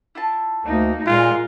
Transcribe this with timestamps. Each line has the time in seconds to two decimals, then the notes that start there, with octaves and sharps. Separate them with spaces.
0.15 E4 F4 A5
0.65 D2 A#3 D#4
1.07 A#2 G#3 F4 A#4 F#5